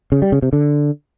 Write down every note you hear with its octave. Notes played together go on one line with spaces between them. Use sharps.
C#3
G3
C#3
C3
D3